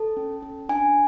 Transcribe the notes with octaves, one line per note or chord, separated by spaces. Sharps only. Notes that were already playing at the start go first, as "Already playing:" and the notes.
Already playing: A4 A5
C#4
C#4
D4 G#5